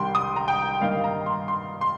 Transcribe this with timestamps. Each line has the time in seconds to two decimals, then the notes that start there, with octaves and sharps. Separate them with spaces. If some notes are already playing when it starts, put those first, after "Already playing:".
Already playing: C2 C3 D#3 G3 G5 C6
0.15 D#6
0.36 A#5
0.48 G5
0.82 G2 D#3 A#3 D#4 F5
1.04 A#5
1.26 C6
1.48 C6
1.81 C6